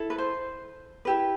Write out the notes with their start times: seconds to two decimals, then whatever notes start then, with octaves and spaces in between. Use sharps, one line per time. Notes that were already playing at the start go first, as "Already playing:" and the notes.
Already playing: E4 A4
0.10 B4
0.18 C5
1.05 E4 G4 B4